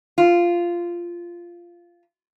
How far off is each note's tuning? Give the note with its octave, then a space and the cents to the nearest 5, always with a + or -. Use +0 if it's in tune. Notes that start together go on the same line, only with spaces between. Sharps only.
F4 -10